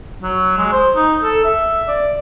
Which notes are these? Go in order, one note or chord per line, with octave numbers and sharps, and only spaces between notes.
F#3
G#3
C5
D#4
A4
E5
D5